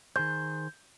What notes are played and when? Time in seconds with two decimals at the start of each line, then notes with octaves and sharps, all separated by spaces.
0.16 D#3 G#4 C5 G6